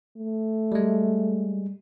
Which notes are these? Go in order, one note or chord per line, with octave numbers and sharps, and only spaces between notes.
A3
G3 G#3